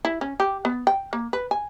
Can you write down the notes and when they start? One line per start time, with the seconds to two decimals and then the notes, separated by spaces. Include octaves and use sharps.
0.05 E4
0.21 C#4
0.40 G4
0.65 B3
0.87 G5
1.13 A#3
1.33 B4
1.51 G#5